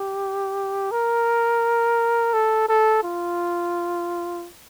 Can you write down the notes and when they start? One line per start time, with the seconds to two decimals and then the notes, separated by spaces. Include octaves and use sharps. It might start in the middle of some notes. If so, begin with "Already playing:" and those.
Already playing: G4
0.91 A#4
2.33 A4
2.68 A4
3.03 F4